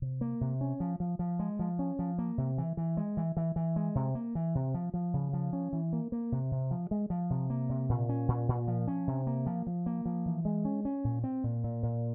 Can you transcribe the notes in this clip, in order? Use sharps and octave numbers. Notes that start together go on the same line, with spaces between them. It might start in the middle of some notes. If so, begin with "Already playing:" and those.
C3
A#3
C3
C#4
F3
F3
F3
G#3
F3
C#4
F3
A#3
C3
E3
E3
G#3
E3
E3
E3
G#3
C3
A#3
E3
C3
F3
F3
C#3
F3
C#4
E3
A#3
A#3
C3
C3
F3
G#3
F3
C3
A#3
C3
A#2
C#4
A#2
A#2
F3
C#4
C3
A#3
F3
F3
A#3
F3
E3
G#3
C#4
C#4
A#2
C4
A#2
A#2
A#2